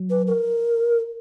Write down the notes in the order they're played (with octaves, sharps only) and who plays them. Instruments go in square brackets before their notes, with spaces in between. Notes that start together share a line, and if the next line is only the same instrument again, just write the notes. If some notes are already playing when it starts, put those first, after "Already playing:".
Already playing: [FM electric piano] F#3
[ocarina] B4
A#4